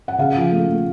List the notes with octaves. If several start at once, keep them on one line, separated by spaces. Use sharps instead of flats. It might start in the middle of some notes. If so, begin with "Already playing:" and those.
F#5
C#3 F5
F3
A3
A3